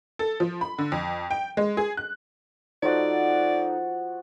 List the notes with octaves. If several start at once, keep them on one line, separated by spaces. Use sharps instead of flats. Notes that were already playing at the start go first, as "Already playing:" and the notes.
A4
F3
B5
D3
F2
G5
G#3
G#4
F#6
F3 D#4 F#4 A4 D5 F#5 A6